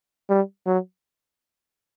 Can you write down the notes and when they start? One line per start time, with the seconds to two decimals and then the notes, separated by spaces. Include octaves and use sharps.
0.29 G3
0.66 F#3